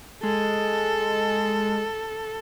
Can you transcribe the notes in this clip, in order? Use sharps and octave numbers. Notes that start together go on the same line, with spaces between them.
G#3 A4